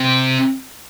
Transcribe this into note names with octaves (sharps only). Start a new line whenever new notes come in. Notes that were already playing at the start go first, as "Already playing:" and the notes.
Already playing: C3